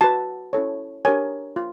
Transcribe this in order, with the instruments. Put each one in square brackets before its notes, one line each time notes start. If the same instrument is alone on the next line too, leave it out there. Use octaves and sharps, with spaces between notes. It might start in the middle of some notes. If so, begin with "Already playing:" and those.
[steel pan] F#4 B4 A5
C#4 E4 A4 C#5
D4 G4 A#4 C#5 G#5
F4